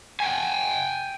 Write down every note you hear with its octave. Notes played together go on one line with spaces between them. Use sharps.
G5 G#5